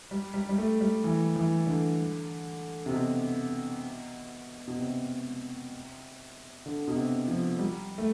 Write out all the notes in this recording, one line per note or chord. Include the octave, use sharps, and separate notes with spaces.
G3
G3
G3
A3
G3
E3
E3
D3
C3
B2
B2
C3
D3
B2
C3
F3
G3
A3